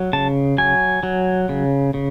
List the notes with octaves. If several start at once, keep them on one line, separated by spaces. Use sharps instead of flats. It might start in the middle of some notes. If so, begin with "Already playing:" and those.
Already playing: F#3
C#3 A5
F#3 G#5
F#3
C#3
C#3